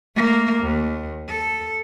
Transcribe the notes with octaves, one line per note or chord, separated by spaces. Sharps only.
A3 A#3
D#2
A4